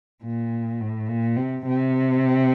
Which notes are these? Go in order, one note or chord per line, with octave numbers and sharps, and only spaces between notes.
A#2
A2
A#2
C3
C3